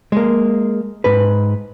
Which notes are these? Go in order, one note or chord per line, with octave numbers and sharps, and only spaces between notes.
G#3 A#3
G#2 B4